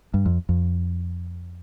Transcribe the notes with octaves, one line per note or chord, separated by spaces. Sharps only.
G2
F2
F2